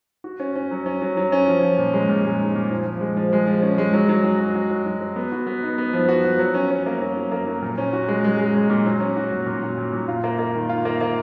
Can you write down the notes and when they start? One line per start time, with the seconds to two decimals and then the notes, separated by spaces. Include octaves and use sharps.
0.24 F#4
0.40 C#4
0.56 C#4
0.71 F#3
0.86 C#4
1.02 F#3
1.17 F#3
1.32 C#4
1.48 F3
1.62 F3
1.78 A#2
1.94 G#3
2.09 A#2
2.25 G#3
2.40 D#4
2.56 A#2
2.71 F3
2.86 F3
3.01 G#3
3.17 F3
3.33 G#3
3.47 F3
3.62 C#4
3.78 G#3
3.93 F#3
4.09 F#3
4.24 F#4
4.40 F#3
4.55 F#4
4.71 F#3
4.86 F#3
5.01 F#3
5.16 B3
5.32 F#4
5.47 B3
5.63 D#4
5.78 B3
5.93 F3
6.09 F#4
6.25 F3
6.39 F#3
6.55 C#4
6.71 C#4
6.86 A#3
7.01 F#3
7.17 F#3
7.32 A#3
7.47 F#3
7.62 A#2
7.78 C#4
7.93 F#4
8.08 G#3
8.24 G#3
8.39 G#3
8.55 G#3
8.70 A#2
8.86 F#3
9.00 C#4
9.17 F#4
9.32 A#2
9.46 A#2
9.63 F#4
9.77 A#2
9.93 A#2
10.08 F4
10.24 A#3
10.39 A#3
10.55 D#3
10.69 F4
10.85 A#3
11.01 A#3